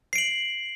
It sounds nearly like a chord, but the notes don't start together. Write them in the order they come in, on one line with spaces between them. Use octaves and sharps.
C7 D7 F#7